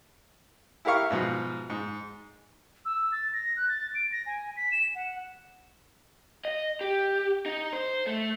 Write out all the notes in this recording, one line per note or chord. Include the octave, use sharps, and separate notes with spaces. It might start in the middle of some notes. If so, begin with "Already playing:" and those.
E4 G4 A#4 F5 C#6
G#2 B2 F3
G#2
E6
A6
A#6
F#6
A6
D7
A#6
G#5
B6
E7
F#5
D#5
G4
D#4
C5
A3